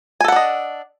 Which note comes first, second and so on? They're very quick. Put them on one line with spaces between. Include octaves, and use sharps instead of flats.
G#5 A4 F#5 D4 D#5